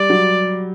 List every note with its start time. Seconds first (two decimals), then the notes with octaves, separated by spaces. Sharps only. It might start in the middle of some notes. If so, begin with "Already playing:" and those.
Already playing: G3 D5
0.10 F#3